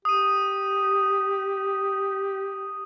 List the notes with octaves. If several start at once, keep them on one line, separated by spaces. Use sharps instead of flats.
G4 D#6 D#7